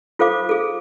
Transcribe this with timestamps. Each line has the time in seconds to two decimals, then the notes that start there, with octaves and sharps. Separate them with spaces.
0.19 F4 A4 C5 F5 D6
0.49 G#4 A4